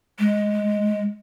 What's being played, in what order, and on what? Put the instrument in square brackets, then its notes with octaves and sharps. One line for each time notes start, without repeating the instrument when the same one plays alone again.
[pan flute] G#3